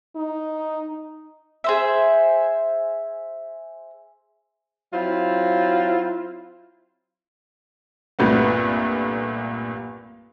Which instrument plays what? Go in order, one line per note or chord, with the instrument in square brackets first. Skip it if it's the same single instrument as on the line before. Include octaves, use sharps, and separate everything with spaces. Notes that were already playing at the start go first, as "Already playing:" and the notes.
[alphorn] D#4
[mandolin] G#4 C5 E5
[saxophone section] F#3 C4 E4 F4
[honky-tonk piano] C2 G2 A#2 A3 B3